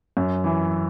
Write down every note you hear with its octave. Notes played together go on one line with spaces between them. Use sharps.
F#2
E3